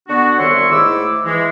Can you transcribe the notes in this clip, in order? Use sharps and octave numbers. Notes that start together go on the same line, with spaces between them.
D3 B3 D4 F#4
C2 D#3 C#5 E5 C6 C#6
G#2 A3 E4 D6 E6
E3 G#3